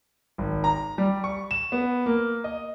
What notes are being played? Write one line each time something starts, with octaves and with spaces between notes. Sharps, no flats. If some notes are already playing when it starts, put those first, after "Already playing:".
G#1
A#5
G3
C#6
E7
B3
A#3
D#5